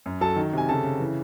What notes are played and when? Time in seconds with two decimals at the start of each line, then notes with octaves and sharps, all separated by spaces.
0.06 F#2
0.21 F#3 A4 A5
0.36 D#3
0.53 C3 G#5
0.68 C#3 A4 A5
0.84 C#3
1.00 E3